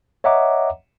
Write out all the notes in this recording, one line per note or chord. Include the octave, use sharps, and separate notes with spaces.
C#5 D#5 E5 F#5 A#5 D6